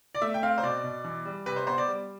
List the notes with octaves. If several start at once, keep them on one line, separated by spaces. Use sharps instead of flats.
D5
A3 E5
G5
C4 F5
C5
B2 D5
B2
E3
G3
C3 B4
C5
B3 C5
D5
G3